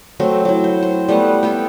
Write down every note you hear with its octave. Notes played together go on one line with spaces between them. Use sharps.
F#3 A3 C4
F#3 E4
C5
C5
G3 A3 B3 F#5
B3 A4 G5